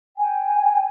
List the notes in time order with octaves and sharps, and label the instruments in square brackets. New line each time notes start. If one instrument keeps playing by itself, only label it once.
[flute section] G5 G#5